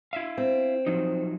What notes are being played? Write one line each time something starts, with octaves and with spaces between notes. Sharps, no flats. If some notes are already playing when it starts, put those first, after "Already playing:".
E4 E5 F5
C4
F3 F#3 D#4